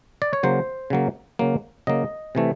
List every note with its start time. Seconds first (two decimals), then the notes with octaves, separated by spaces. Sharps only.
0.22 D5
0.33 C#5
0.43 C#3 F#3 A#3 C5
0.90 C#3 F#3 A#3
1.39 C#3 F#3 A#3
1.87 C#3 F#3 A#3 D#5
2.35 C3 E3 A3